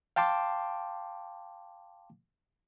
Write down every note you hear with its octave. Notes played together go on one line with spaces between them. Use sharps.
F5 G5 A5 C6 D6